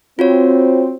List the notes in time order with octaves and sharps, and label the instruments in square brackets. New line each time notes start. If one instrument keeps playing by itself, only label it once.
[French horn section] C4 [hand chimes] F4 F#4 C#5